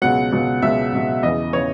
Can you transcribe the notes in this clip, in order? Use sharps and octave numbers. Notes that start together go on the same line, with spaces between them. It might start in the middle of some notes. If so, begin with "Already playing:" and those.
C#2 B2 F#3 F#5
C#2 B2 F#3
C#2 B2 F#3 E5
C#2 B2 F#3
E2 C#3 E3 D#5
C#3 E3 C#5